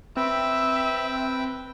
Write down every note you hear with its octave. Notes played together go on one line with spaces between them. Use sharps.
C4 B4 E5 G5